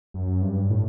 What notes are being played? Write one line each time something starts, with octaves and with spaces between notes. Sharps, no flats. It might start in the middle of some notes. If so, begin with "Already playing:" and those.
F#2
G2
A2